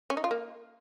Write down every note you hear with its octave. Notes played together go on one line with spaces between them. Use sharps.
C#4
D#4
F4
A#3